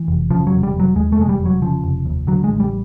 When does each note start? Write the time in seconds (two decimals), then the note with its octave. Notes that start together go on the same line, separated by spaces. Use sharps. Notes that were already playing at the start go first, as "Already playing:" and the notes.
Already playing: E3
0.08 F1
0.30 C#3 F3
0.47 F#3
0.52 F1
0.63 G3
0.74 F1
0.80 F#3
0.95 D#2 G#3
1.12 A3
1.17 F1 G#3
1.29 G3
1.40 F1
1.46 F#3
1.62 C#3 F3
1.84 F1
2.06 D#2
2.27 D3 F#3
2.44 G#3
2.49 A1
2.60 G3